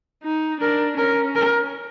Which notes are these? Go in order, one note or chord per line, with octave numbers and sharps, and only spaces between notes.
D#4
D4 A#4
C#4 A#4
A#4